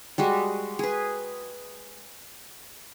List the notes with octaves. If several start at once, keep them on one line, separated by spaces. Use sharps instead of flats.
G3 G#3 F#4
G#4 B4